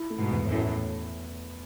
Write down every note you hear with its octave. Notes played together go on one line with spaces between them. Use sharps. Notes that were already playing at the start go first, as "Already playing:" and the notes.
Already playing: E4
A3
G#2 B2
E2
F#2 A2
E4